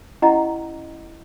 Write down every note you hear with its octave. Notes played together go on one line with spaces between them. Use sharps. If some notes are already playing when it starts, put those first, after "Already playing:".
C#4 E4 G4 D#5 F#5 A#5